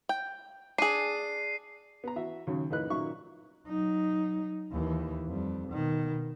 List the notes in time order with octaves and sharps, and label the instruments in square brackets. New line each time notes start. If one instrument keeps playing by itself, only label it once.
[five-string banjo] G5
[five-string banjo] D4 G#4 [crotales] C7 D#7
[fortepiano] B3 A#5
E3 F#4 E5
D#2 C#3 F#3
F2 A2 D#3 D#4 B4 F#6
A#2 D#3 F#3 A#3 E5 C#6
[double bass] F#3 D#4
D#2 E3
F2 G3
B2 D#3